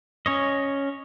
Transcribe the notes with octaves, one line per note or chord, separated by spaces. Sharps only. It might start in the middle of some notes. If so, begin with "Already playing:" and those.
C#4 C#5 D#5